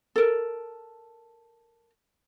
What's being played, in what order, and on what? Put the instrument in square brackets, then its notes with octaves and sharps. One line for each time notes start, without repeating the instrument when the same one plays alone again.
[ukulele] A4 A#4